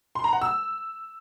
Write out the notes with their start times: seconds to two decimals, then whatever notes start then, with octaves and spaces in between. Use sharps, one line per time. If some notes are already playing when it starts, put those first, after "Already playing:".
0.15 C6
0.24 A#5
0.33 F#5
0.42 E6